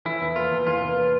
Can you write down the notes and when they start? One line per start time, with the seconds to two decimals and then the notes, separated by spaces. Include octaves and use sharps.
0.05 E3 E4
0.21 E2
0.36 A#3 F4
0.51 E2
0.67 E3 F4
0.82 E2
0.97 A#3